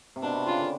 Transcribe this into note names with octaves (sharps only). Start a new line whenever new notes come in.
C3
B2 D4
C3
C#3 F4
D3